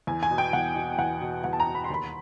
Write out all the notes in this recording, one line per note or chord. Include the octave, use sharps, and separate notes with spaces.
E2 G#5
G#5
B2
G5
E2 F#5
B2
E2 F#5
B2
E2 F#5
A5
A#5
B2
B5
C6
D#2 B5